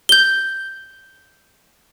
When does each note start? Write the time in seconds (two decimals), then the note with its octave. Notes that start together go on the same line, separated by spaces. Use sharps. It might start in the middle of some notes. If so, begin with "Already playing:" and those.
0.09 G6 G7